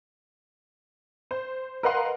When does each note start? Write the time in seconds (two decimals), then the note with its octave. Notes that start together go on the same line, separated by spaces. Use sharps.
1.31 C5
1.83 A#4 B4 D#5 F5 F#5 C6